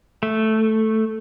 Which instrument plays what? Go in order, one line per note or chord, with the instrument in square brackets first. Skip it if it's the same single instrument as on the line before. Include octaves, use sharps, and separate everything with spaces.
[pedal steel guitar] A3